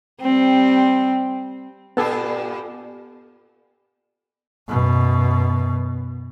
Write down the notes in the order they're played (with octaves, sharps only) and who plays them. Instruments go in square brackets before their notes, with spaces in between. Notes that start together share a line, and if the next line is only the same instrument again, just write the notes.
[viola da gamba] G3 C4
[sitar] G2 A#2 G4 [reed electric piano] B3 A4 G#5
[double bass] F#2 B2